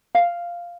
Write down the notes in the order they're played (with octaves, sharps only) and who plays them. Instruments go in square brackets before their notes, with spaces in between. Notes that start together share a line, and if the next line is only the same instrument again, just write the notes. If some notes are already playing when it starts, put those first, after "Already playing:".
[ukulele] F5